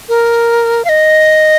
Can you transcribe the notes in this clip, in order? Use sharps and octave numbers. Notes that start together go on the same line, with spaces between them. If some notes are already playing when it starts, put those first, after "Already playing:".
A#4
F5
D#5